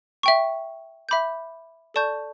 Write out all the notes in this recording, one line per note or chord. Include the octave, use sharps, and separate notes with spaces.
E5 G5 C#6
E5 B5 D6 G6
A4 D5 A5 C#6 G6